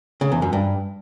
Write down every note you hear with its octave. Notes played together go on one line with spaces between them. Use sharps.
C#3
E2
F#2
G2